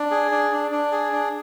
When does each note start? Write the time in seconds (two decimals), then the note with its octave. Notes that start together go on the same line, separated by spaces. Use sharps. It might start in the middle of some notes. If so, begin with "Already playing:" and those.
Already playing: D4
0.11 G#4
0.31 D4
0.52 D4
0.72 D4
0.92 G#4
1.13 D4